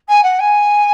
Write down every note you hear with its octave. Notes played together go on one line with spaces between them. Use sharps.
G#5
F#5
G#5